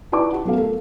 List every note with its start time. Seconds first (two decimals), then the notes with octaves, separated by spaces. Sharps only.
0.12 D#4 E4 B4 D5 A5 D6
0.33 G4 F#5
0.45 F#3 A3 B3 A4 F5
0.56 A3 A4 A#4